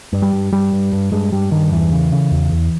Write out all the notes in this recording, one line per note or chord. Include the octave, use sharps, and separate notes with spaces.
G2
G3
G2
G2 G3
G2
G2
G2 G#3
G2 G3
G2 D#3
E2 E3
C#3
C#3
E2
E2